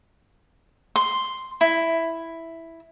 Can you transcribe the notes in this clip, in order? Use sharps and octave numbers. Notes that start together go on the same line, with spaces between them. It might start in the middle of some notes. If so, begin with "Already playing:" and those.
C6
E4